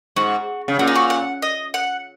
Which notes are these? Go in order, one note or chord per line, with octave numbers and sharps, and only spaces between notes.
G#2 F#4
C#3
A#2 F#4
D#4
F#4
F#5
D#5
F#5